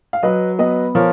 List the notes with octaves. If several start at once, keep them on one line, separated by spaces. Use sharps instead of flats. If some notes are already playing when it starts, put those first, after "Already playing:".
F5
F#3 B4 D#5
B3 B4 D#5
F3 A#4 C#5